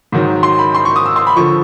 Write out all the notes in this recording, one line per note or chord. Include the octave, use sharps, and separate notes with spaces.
G#2 D#3 F#3
C6
B5
C6
C#6
D#6
E6
C6
B5
D3 F3 C#6